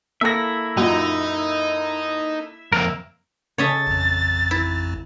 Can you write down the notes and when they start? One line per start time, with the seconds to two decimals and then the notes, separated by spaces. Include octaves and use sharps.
0.21 A#3 E4 A4 E5 A#6
0.77 F#2 A#2 D#4
2.73 F2 A#3 A#4 E5
3.58 C#3 C#4 A4 C#5 D#5 E5 A6
3.87 A1 F2
4.51 E4